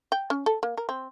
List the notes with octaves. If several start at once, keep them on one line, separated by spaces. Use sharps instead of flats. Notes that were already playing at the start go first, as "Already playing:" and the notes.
G5
C#4
A4
A#3
A#4
C4